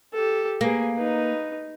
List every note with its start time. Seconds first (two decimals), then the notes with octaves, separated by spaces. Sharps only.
0.14 G4 A4
0.61 A#3 G#4 B4
0.96 D#4 B4